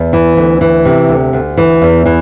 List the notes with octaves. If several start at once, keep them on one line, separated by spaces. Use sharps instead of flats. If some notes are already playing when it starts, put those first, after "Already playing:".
Already playing: E2
E3
D2
E3
C3
D2
D2
E3
E2
E3